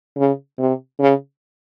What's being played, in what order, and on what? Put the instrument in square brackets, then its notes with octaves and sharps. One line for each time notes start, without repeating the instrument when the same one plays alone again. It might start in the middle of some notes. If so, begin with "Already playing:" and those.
[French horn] C#3
C3
C#3